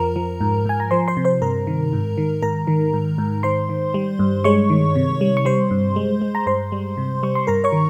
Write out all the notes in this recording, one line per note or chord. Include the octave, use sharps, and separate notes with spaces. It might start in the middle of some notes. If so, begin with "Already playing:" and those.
Already playing: F2 F3 A#4 A#5
F3
G#2
G#2 G#5
A#5
F3 C5 C6
C5 C6
C3
C5 C6
G2 A#4 A#5
D#3
G#2
D#3
G#2 A#4 A#5
D#3
G#2
G#2
D#3 C5 C6
D#3
G3
G2
G#3 C#5 C#6
D#3
C3
G3
C#6
G3 C5 C6
G2
G#3
G#3
A#5
G2 C5 C6
G3
C3
G3 C#6
C6
G2 A#4 A#5
C#5 C#6
D#3